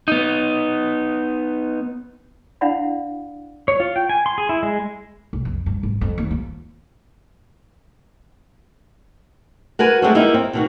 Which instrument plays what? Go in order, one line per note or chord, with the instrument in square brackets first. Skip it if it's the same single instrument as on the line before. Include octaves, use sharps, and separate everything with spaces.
[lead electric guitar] B3 D#4
[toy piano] D4 E4 D5 F5 F#5 B5
[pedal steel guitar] C#5
F4
G5
G#5
C6
G#4
E4
G#3
[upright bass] B1
F2
G2
G#1
F2
D#2
F4
[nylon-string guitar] F#4 A#4 B4 G#5
G#3 A3 C4 D4 F#4
D#3 G3 A#3 D#4 E4
C4
B2 D#3 F#4